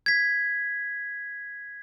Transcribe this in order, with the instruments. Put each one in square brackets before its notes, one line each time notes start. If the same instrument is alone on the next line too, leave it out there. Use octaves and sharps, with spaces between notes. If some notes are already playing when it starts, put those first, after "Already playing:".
[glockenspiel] G#6 B6